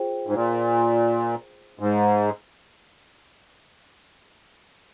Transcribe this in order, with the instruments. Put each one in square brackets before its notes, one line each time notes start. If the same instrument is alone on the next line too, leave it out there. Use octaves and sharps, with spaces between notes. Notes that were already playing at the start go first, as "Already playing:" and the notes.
Already playing: [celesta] F4 G#4 C5 G5
[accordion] G#2
A#2
G#2